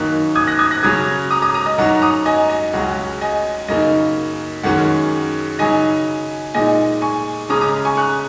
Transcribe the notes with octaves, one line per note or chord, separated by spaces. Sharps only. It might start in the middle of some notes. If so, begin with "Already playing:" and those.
Already playing: F#2 D#3 A#3 D#4 F#6
D#6 G#6
F#6 A#6
D#6 G#6
F#6 A#6
C#3 F#3 C#4 D#6 G#6
A#5 D#6
A#5 D#6
A#5 D#6
D#5
F#2 F#3 D#4 F#5 A#5
A#5 D#6
D#5 G#5
D#5
C#2 C#3 F#3 C#4 F#5
D#5 G#5
F#2 C#3 A#3 D#4 D#5
F#2 D#3 G#3 C#4 F#5
C#3 F#3 D#4 D#5 G#5
A#2 G#3 D#4 D#5 G#5
G#5 C#6
C#3 G#3 C#4 A#5 D#6
A#5 D#6
G#5 C#6
C#6 F#6